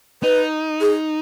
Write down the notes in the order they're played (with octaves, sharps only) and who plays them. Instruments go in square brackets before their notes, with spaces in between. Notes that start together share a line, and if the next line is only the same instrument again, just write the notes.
[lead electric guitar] D#4 [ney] B4
[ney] G#4